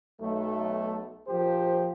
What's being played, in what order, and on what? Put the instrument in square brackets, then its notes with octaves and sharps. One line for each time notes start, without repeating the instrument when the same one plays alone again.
[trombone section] B1 A3
A#1 F3 G4 C5